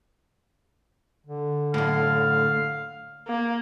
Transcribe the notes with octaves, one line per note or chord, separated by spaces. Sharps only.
D3
F#2 A2 F5
A#3